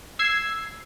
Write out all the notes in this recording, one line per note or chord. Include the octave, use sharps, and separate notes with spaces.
E6 G#6 C7